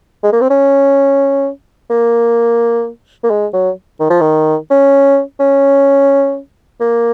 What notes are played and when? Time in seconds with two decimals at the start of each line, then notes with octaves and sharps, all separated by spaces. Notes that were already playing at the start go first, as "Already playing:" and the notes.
0.23 G#3
0.33 A#3
0.41 C4
0.50 C#4
1.90 A#3
3.24 A#3
3.30 G#3
3.53 F#3
4.00 D#3
4.10 F3
4.21 D#3
4.70 C#4
5.40 C#4
6.80 A#3